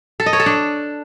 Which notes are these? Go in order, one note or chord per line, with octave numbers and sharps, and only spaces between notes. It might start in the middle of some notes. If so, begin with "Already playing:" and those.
A4
D#5
C#5
A4
D4